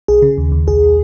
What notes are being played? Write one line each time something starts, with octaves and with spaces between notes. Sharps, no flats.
B1 G#4
C#3
D#2
D#2
B1 G#4